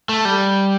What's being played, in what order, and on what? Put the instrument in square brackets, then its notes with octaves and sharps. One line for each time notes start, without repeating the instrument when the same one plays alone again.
[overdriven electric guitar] A3
G3